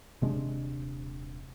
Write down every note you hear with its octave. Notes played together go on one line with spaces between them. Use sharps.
D#1 C3 G#3 D4